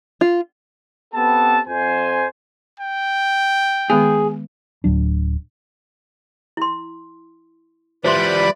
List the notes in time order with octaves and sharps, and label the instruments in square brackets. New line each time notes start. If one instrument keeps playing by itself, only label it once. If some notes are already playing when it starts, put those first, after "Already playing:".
[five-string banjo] F4
[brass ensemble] B3 C4 G4 A4 B4 A5
F2 C5 G#5
[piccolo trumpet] G5
[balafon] D#3 G#3 B3 [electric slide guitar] G#4
[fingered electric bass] D1 C#2 F#3 D4
[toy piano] E4 C6
[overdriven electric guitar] F3 G3 [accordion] B4 D5 B5 [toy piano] C5 E5 C6